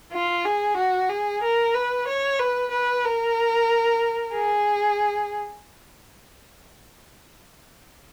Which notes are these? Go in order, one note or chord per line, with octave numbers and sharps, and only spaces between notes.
F4
G#4
F#4
G#4
A#4
B4
C#5
B4
B4
A#4
G#4